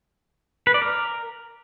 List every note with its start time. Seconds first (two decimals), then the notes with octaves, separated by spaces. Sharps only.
0.67 B4
0.74 D5
0.82 A#4